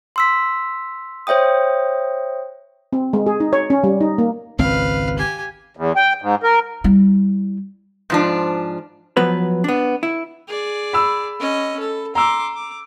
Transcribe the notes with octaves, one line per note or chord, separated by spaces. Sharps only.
C6 E6 B6
C5 C#5 E5 G5 D#6
C4
G#3
G#4
D#4
C#5
C#4
G3
D#4
A#3
G#1 C#2 C4 B4 F5
G4 G#5
E2
G5
G#2
A#4
G3 E4
G#2 F3 D4
F3 F#3 B3 B4
B3 D4
E4
G#4 D5
B5 E6
C#4 D#5
A4
A#5 C6 D6 E6
D6